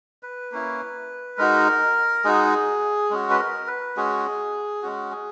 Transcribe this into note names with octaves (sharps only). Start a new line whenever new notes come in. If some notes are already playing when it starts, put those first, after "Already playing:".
B4
A#3 C#4 E4
G#3 D#4 F#4 A#4
G#3 D#4 F#4 G#4
G#3 C#4 F#4
B4
A#4
B4
G#3 C#4 F#4 G#4
G#3 C#4 F#4
G#4